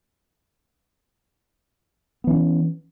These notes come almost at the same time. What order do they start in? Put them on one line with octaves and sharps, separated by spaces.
B3 E3 C#4